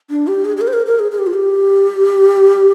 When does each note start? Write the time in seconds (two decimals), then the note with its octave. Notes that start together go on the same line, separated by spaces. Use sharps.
0.10 D4
0.27 G4
0.45 G#4
0.57 G#4
0.61 A#4
0.68 C5
0.73 A#4
0.86 A#4
0.99 G#4
1.12 G#4
1.18 G4
1.27 F4
1.33 G4